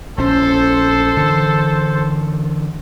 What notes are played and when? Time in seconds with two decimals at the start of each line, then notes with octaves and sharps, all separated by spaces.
0.18 A#1 C#4 A4 C5
1.17 D3 E3